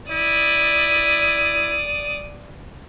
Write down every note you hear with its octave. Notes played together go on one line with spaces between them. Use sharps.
E4 D5 D#6